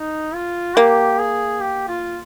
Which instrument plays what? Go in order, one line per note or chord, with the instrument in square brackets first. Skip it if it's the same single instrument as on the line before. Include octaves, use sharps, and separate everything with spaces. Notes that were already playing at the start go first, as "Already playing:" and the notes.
Already playing: [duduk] D#4
F4
[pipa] A#3 [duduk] G4
[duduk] G#4
G4
F4